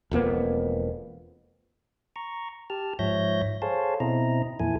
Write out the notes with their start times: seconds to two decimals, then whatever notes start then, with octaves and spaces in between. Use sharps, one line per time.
0.11 E1 F2 A#3 B3
2.16 A#5 C#6
2.70 G4 A5 F6
2.99 G#2 F3 C#5 E5 G6 A#6
3.62 G#4 A4 C5 C#5 F5 A5
4.00 B2 C4 E4 D#5 A#5
4.60 F2 A#2 E3 E4 A4 G#5